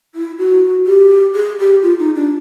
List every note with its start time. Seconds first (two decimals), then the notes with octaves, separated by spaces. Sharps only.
0.15 E4
0.39 F#4
0.87 G4
1.35 G#4
1.59 G4
1.83 F4
1.99 D#4
2.15 D4